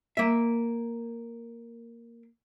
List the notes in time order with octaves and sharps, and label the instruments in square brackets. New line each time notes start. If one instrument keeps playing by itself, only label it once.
[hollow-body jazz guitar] A#3 E5